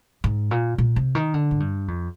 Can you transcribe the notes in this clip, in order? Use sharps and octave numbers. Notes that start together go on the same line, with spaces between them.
G#2
A#2
A#2
C3
D#3
D3
G#2
G2
F2